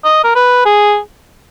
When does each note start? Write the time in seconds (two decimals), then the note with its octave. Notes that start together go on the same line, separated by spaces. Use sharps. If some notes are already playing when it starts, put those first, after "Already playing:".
0.04 D#5
0.24 A#4
0.35 B4
0.66 G#4